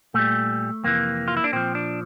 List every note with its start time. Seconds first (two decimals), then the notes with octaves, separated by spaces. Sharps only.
0.14 A#2 G3 A3
0.84 F2 C3 E3 A#3
1.28 F4
1.37 E4
1.44 D4
1.53 A#2 F3 C4
1.75 D4